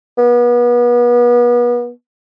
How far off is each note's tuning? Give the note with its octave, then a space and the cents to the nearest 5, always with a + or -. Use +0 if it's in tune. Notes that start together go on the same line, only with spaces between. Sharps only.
B3 -35